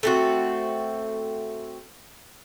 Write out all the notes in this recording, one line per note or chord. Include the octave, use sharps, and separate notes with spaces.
A3 C4 F#4